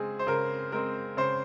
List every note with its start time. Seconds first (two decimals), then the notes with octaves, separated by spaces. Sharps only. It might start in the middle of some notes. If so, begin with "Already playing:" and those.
Already playing: C#3 G#3 C4 G#4
0.19 C5
0.27 C#3 A#4
0.72 G#3 C4 A#4
1.17 C#3 C5